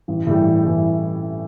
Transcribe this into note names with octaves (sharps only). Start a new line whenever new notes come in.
A1
A2 E3 G3
A1
A2 E3 G3